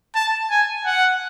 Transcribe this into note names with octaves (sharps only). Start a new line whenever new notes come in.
A5
G#5
F#5